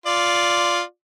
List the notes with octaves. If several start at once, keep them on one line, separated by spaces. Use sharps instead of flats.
F4 D5